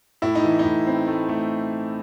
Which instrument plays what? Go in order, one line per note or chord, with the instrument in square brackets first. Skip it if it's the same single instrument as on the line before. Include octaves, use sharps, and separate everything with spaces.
[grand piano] A2 E4
D#4
E3
D#4
A2
C4
A3
A3